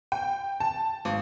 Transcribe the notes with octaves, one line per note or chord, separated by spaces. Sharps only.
G5
A5
G#1